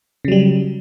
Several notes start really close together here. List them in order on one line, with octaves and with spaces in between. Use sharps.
C#3 F#3 G3